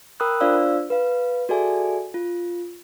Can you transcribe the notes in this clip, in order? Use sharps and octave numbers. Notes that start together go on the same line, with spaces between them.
A#4 G5 B5 D#6 E6 F#6
D4 F4 C5 D5 F5 E6
B4 F5
F#4 G#4 A4 D5 E5 G#5
F4